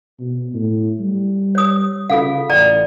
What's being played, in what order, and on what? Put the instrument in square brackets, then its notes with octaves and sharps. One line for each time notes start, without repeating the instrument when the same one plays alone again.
[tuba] B2
A2
G3
[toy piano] C#5 D#6
[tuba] C#3 [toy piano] F4 A4 F5
[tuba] A1 [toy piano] D5 G5 A#5